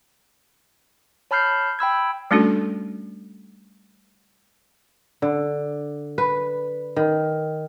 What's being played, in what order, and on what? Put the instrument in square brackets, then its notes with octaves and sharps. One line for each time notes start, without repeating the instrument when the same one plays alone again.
[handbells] C#5 A5 B5 F6 G6 C7
G5 B5 E6 G#6
[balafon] G3 A3 C#4 D4 F#4 A4
[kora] D3
B4
D#3